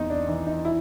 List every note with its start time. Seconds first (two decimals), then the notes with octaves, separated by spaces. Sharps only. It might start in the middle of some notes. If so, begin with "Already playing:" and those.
Already playing: E2 C3 D#4
0.10 D4
0.28 E3 D#4
0.47 D#4
0.65 E4